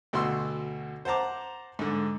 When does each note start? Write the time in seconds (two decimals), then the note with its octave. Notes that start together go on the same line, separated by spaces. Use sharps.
0.13 D2 B2 F#4 C6 E6
1.05 C5 F#5 A5 A#5 D6
1.79 G#2 D3